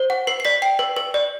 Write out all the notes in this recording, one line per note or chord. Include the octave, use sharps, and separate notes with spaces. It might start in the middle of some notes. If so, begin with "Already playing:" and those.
Already playing: C5
F#5
B4 C7
C7
D5 B6
G5 C7
B4
B4
D5